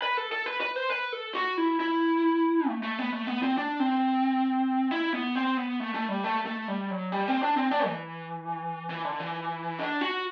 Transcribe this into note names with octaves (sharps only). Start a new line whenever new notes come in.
B4
A4
A4
B4
B4
C5
B4
A4
F#4
E4
E4
A3
A3
B3
A3
B3
C4
D4
C4
E4
B3
C4
B3
A3
A3
G3
A3
A3
G3
F#3
G3
C4
D4
C4
D4
E3
E3
D3
E3
D4
F#4